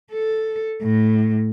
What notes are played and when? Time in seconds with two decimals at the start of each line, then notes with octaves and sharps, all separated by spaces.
0.13 A4
0.82 A2